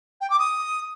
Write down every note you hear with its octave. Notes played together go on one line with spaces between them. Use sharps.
G5
D6
D#6